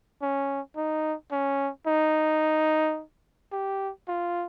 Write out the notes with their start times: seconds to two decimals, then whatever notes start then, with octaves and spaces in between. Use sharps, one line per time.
0.22 C#4
0.76 D#4
1.32 C#4
1.87 D#4
3.52 G4
4.08 F4